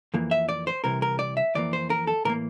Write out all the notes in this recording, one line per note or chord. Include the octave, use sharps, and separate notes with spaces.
F2 E3 A#3
E5
D5
C5
C2 C3 E3 A#4
A#4
D5
E5
F2 E3 A#3 D5
C5
A#4
A4
A2 E3 A#3 A#4